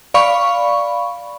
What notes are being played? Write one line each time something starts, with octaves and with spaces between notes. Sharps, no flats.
D5 F5 B5 C#6